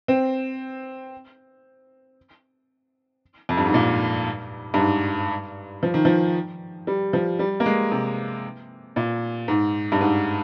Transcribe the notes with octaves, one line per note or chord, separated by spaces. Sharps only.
C4
F2
G2
G#2
A#2
G2
G#2
F3
D#3
F3
G3
F3
G3
A#3
G#3
C3
A#2
G#2
G2
G#2